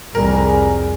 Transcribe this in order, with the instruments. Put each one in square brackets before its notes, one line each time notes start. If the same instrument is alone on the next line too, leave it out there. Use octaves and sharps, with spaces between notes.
[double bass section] C2 F2 [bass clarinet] G3 [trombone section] G#4 [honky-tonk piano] A#4